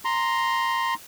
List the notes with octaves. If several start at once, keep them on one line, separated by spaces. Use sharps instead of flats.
A#5 C6